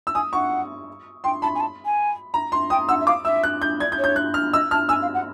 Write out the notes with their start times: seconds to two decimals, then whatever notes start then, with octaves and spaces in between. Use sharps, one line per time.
0.07 E6
0.14 G#5 D#6
0.33 F#5 C#6
1.24 G5 C6
1.42 A5 B5
1.55 G#5
1.60 A5
1.85 G#5
2.34 A#5
2.52 C6
2.70 G5 D#6
2.89 F#5 E6
3.01 E5
3.07 F5 D6
3.25 E5 E6
3.43 F#6
3.62 G6
3.80 D5 G#6
3.92 G6
3.98 C#5
4.04 G6
4.16 F#6
4.34 F6
4.53 D#5 E6
4.71 A5 F6
4.89 G#5 E6
5.02 F5
5.14 F#5